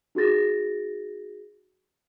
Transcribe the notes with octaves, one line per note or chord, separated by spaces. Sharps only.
D#4 F#4 G#4 A6 A#6